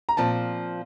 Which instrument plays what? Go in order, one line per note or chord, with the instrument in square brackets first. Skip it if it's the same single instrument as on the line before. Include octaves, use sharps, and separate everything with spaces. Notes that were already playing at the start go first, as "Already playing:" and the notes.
[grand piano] A#5
[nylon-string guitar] A#2 F3 C4 [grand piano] A5